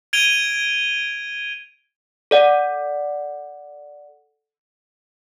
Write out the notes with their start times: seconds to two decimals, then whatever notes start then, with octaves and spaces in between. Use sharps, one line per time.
0.13 G#6 D7 D#7 F7 G7
2.31 A4 D5 F#5